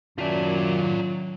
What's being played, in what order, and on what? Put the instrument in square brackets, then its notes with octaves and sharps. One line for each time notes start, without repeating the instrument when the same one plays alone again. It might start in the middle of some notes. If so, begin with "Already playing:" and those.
[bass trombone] F#2 [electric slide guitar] D#3 E5 A5 [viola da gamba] F#3 [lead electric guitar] F4 D5